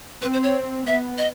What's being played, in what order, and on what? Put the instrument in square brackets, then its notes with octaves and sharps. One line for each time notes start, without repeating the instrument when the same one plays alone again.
[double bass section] C4 [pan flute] B4
[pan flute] C5
C#5
[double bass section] B3 [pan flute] E5
[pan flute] D#5